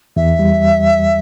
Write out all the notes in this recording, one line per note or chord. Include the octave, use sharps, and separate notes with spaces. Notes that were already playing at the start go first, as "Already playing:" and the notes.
E2 E5
G3